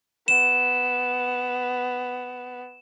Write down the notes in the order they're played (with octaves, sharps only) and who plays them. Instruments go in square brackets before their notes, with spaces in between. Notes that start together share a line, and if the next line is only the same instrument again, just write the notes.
[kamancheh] B3 [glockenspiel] E7